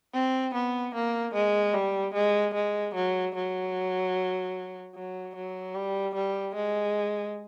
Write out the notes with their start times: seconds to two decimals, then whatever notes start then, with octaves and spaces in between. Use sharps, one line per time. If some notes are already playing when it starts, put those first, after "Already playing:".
0.14 C4
0.54 B3
0.94 A#3
1.34 G#3
1.74 G3
2.14 G#3
2.54 G#3
2.95 F#3
3.35 F#3
4.95 F#3
5.36 F#3
5.75 G3
6.15 G3
6.56 G#3